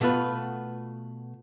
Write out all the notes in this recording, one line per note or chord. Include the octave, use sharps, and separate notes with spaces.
B2 A3 B3 F4 B4